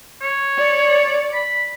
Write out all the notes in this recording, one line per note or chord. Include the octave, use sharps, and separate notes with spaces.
C#5
D5
B5